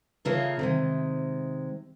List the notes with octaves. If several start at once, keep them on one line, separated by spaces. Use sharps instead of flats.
C#3 A3 A#3 F4 G#4 A4
C3 D#3 G#3